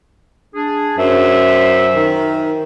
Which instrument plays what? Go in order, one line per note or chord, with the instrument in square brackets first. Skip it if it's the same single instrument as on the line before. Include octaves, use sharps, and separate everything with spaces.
[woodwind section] D4 G#4
[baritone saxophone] F#2 [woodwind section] C5 E5
[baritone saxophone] D#3